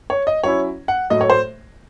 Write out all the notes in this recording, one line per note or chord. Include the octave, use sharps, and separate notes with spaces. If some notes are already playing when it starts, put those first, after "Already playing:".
C#5
D#5
F#3 C#4 E4 C#5
F#5
A2 F#3 A3 D#5
C#5
C5